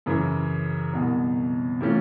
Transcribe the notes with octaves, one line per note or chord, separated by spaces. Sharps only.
F#2 C#3 E3
C2 B2 F#3
C3 E3 A3 C#4 F4